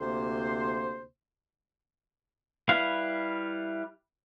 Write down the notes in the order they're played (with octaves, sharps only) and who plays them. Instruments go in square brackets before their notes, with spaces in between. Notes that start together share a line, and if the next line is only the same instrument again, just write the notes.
[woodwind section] D2 C3 A#3 C5
[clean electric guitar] G3 E4 B4 F5